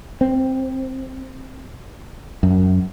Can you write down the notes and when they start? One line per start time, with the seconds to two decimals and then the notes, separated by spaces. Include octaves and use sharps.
0.21 C4
2.43 F#2